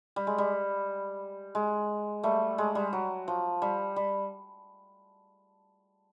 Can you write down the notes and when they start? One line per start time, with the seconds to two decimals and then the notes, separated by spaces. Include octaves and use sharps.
0.16 G3
0.27 G#3
0.38 G3
1.55 G#3
2.23 G3 A3
2.58 G#3
2.75 G3
2.93 F#3
3.28 F3
3.62 G3
3.96 G3